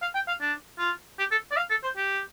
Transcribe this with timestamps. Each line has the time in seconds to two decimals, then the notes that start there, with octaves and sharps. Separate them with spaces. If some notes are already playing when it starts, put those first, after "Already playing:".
0.02 F5
0.15 G5
0.28 F5
0.41 D4
0.79 F4
1.19 G4
1.31 A4
1.51 D5
1.57 F5
1.70 A4
1.83 C5
1.96 G4